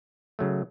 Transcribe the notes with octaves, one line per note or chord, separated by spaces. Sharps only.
C#3 F#3 A3